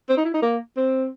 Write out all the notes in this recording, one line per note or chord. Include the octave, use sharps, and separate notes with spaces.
C4
D#4
E4
D#4
A#3
C4